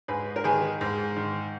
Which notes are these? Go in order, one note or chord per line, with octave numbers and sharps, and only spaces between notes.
G#2 G#4 B4
A#4
D#3 G#4 B4
G#2
D#3